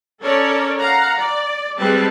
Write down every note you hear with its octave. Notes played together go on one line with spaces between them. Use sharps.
C#4 A4 A#4 C#5 D5
F5 F#5 A#5
D5
G3 G#3 C4 B4 A5